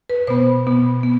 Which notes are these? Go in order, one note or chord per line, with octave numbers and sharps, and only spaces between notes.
B4
B2 B3 C5
B2 B3
B3